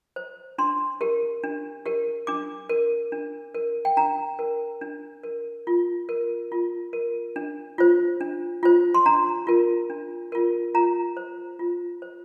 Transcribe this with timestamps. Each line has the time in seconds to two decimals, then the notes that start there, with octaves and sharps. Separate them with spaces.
0.16 C5
0.58 D4 C6
1.01 G4 A#4
1.44 D4
1.86 G4 A#4
2.27 D4 D6
2.69 A#4
3.12 D4
3.54 A#4
3.85 G5
3.97 D4 A#5
4.39 A#4
4.81 D4
5.23 A#4
5.67 F4
6.09 A#4
6.52 F4
6.93 A#4
7.36 D4
7.78 F4 C5
8.21 D4
8.63 F4 C5
8.94 C6
9.06 D4 A#5
9.47 F4 A#4
9.90 D4
10.32 F4 A#4
10.75 F4 A#5
11.17 C5
11.59 F4
12.02 C5